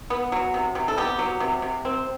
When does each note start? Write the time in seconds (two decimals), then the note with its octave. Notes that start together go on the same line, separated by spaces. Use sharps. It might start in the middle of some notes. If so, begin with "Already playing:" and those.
0.10 B3
0.32 F#3
0.54 C3
0.75 C3
0.88 A4
0.97 B3 G4
1.19 F#3
1.40 C3
1.62 C3
1.85 C4